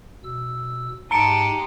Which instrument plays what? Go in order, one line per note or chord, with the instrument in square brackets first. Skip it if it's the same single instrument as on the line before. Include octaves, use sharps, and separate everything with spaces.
[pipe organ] B2 E6
[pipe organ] G#2 [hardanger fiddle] G#3 G4 [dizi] A5 [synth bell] A#5 C#7 D7